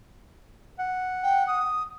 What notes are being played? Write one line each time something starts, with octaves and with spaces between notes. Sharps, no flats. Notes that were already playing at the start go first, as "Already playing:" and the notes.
F#5
G5
D#6